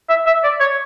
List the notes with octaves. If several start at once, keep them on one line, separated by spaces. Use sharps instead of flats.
E5
E5
D5
C#5